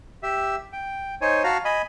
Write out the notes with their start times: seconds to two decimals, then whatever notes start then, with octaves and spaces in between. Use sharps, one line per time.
0.23 G4 E5
0.73 G5
1.21 D#4 C5 C#5 G#5
1.44 F#4 F5 A5 A#5
1.65 D#5 G#5 B5